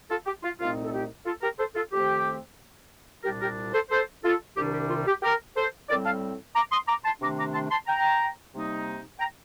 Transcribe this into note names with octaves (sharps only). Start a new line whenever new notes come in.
F4 A4
G4
F4
C2 A#2 A3 C4 D#4 F4
A4
G4
F4 A4
G4 A#4
A4 C5
F4 A4
F2 D#3 A3 C4 G4
C2 A#2 G3 D4 G4 A#4
G4 A#4
A4 C5
A4 C5
F4 A4
C2 C3 D#3 G3 D4 G4
G4
F4
G4
G4 A#4
A4 C5
A2 G3 C4 A#4 D5
F5 A5
A#5 D6
C6 D#6
A#5 D6
A5 C6
C3 D#3 A3 D4 A#5 D6
A#5 D6
A5 C6
A5 C6
G5 A#5
C3 G3 A#3 D#4
G5 A#5